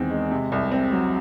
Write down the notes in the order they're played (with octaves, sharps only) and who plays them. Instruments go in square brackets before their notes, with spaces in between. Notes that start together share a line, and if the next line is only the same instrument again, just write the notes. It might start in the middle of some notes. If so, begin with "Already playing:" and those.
Already playing: [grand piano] E2 D#3 G#3 C4
G#3
C3
C2
C4
F#3